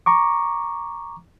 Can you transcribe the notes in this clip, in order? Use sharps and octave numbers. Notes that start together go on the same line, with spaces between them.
A#5 C#6 D6